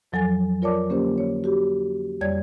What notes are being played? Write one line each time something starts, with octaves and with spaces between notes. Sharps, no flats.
F2 F3 F#3 A4 G#5 A6
F4 A#4 C#5 D5 A5 D6
D3 A#3 C#4 G4 C5
C#5
F#4 G4
F2 G3 C#5 D5 G#6